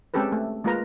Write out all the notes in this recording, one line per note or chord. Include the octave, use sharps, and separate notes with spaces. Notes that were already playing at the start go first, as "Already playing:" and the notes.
G#3 C4 C#4 G4 A4 B4
A3
G#3 A#3 F4 A#4 B4 A#5